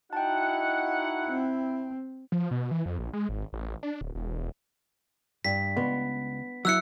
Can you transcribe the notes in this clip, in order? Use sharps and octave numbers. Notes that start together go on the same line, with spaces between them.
D#4 E4 F#4 F#5 G5 A5
C4
F3
B2
E3
F2
A#1
G#3
G#1
A1
D4
D1
E1
G2 B6
C#2 B3
F#3 E4 E6 F#6 C#7